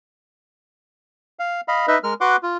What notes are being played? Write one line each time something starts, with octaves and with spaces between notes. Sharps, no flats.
F5
D#5 F5 B5
D#4 B4 D#5 E5
G#3 A#4 F6
F#4 B4 F#5 C6 D6
F4